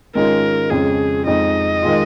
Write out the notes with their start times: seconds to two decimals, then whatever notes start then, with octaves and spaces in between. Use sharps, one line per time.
0.15 G#2 D#3 G#3 C#4 F4 A#4
0.70 F2 C#3 G#3 C#4 G#4
1.27 F2 F3 G#3 D#4 D#5
1.82 D#3 G#3 F4